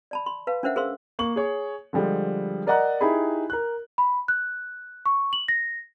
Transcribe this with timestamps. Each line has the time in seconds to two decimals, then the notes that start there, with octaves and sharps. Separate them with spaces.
0.11 D5 A5 B5
0.26 B5 C6
0.47 B4 F5 A5
0.63 C#4 D4 A#4 C5 E5 F#5
0.76 G#4 A#4 C5 F5 C6 E6
1.19 A#3 C#6 F#7
1.36 G#4 C#5
1.93 D3 F3 G3 G#3
2.67 A#4 D5 D#5 F#5 A#5 F#6
3.01 D#4 E4 G4 G#4 B5
3.50 A#4 F#6
3.98 B5
4.28 F#6
5.06 C#6
5.33 F#7
5.48 A#6